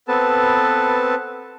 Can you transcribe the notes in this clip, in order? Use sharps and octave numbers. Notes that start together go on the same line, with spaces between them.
B3 C4 A4 B4 A5